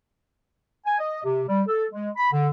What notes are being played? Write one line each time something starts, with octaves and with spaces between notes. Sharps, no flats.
G#5
D#5
C3
G3
A4
G#3
B5
D3